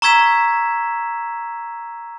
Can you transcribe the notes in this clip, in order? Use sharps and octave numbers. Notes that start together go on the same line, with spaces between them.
A#5 C#6 E6 G#6 B6 E7